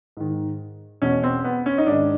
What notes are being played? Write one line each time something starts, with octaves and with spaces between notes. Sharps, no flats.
G#2 D#3
E2 B2 C#4
C4
B3
C#4
D#4
G#2 D#3 D4